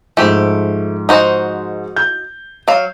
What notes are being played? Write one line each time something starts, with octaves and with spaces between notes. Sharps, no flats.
G#2 F3 A3 G4
D#4 F#4 C5
G6
F#3 F5